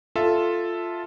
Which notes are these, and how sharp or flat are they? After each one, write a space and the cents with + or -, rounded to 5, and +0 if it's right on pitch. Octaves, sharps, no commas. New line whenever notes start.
F4 +0 A4 +0 E5 +0